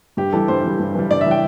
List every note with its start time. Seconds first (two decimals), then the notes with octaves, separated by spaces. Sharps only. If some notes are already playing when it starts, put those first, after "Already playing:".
0.17 G2 G4
0.33 E3 G3 A4
0.48 G2 C5
0.64 E3 G3
0.79 G2
0.95 E3 G3
1.10 G2 D5
1.21 E5
1.26 E3 G3 G5